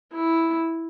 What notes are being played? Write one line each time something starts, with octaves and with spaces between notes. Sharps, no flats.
E4